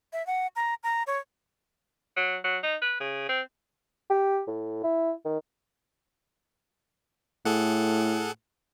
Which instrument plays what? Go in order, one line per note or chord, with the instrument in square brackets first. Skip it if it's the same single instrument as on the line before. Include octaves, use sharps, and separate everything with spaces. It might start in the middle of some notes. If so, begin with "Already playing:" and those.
[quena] E5
F#5
A#5
A#5
C#5
[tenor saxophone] F#3
F#3
D#4
B4
C#3
C4
[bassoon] G4
A2
E4
D#3
[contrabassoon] A2 [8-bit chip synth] G#4 A4 F#5